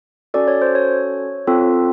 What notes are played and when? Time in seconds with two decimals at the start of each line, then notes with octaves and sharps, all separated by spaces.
0.34 C#4 F#4 A4 D5
0.48 C#5
0.62 C5
0.75 C#5
1.47 C4 F4 A4